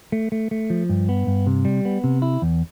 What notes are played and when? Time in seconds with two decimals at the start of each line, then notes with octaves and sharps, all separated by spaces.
0.12 A3
0.32 A3
0.51 A3
0.70 F3
0.89 G2
1.09 B3
1.27 G2
1.47 C3
1.65 G3
1.85 B3
2.04 C3
2.22 E4
2.42 E2